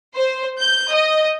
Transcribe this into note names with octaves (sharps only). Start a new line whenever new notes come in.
C5
G6
D#5